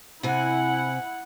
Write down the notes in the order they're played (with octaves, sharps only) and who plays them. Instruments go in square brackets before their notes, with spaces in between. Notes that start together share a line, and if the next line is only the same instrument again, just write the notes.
[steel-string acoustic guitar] C3 G#5 [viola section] E4 F#5